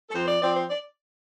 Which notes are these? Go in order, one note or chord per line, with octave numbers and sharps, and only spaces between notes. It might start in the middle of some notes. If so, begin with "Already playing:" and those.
A4
F2 C5
D5
F3 C4 D5
C5
D5